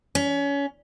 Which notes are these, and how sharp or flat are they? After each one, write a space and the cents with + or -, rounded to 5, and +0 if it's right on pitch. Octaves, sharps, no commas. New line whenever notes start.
C#4 +25